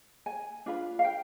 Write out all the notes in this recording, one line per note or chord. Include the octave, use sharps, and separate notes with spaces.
G#5
D4 F4 B4
F5
G5